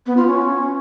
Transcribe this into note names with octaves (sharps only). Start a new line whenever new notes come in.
B3
F4
C#4